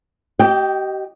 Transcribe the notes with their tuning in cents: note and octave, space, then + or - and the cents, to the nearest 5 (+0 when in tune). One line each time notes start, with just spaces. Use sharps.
G4 -35 D#5 +0 G5 +0